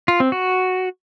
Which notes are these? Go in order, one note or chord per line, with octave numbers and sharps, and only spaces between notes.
F4
C4
F#4